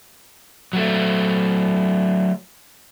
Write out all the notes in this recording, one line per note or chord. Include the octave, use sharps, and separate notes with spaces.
F#3 A3